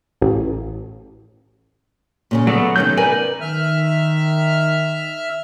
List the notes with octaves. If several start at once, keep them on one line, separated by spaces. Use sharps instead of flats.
A1
A#2 C#3 C#4
F#3 A3 B3 D5
C3 D#3 C#4 G6
A#4 B4 D5 G#5
D#3 E5 F6